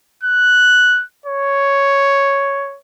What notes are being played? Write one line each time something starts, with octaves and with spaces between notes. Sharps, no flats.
F#6
C#5